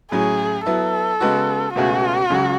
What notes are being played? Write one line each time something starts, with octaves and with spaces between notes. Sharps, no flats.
A2 F#3 C#4 G#4
F#3 B3 E4 A4
C#3 G#3 B3 F#4
C#2 B2 A3 C#4 F#4 G#4
C#2 C#3 F#3 C#4 G#4